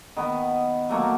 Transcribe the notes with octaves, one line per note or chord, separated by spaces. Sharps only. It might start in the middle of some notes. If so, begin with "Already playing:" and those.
D#3 B3
F#3 A3 A#3 C#6